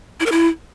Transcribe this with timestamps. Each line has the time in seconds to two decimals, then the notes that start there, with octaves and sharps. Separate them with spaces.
0.20 E4
0.26 A#4
0.32 E4